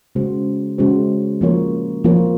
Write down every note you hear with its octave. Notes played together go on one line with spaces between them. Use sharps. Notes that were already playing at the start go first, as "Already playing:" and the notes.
C#3 G#3 C#4 F#4 C5
C#3 G#3 C#4 F#4 C5
F3 A#3 F4 A#4 C#5
F3 A#3 F4 A#4 C#5